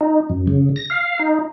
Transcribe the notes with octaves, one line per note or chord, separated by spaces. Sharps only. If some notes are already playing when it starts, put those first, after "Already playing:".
D#4
F#2
C#3
A#6
F5
D#4